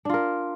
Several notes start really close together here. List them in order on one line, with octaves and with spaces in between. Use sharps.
D4 F4 A#4